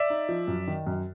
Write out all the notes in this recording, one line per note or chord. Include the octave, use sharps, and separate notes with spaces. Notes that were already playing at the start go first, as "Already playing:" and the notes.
Already playing: D5 E5
D#4
F3
F#2
D#3
F#2